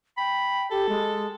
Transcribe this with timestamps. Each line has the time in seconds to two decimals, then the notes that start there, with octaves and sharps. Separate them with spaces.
0.17 G5 B5
0.71 G4 A4
0.89 G#3